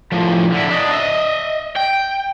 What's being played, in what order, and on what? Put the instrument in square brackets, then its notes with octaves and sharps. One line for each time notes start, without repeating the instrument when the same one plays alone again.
[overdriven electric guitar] A2 F3
D3 E4
D4 D#5
D#5 E5
G5